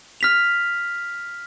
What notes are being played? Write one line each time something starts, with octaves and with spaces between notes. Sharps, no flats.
F6 B6 F7